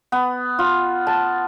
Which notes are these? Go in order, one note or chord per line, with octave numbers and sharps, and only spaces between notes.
B3
F4
A5